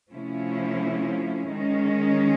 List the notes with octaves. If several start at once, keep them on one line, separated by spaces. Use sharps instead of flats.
C3 F3 A3 C#4 E4
D#3 G#3 C#4